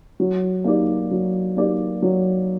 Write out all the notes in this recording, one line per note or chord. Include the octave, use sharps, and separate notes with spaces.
F#3
A#3 D#4 G4 D5
F#3
A#3 D#4 G4 D5
F#3